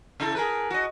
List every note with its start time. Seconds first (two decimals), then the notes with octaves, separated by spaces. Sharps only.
0.20 C#3 E4 A4
0.35 G#4 A#4 B4
0.70 F#4 D#5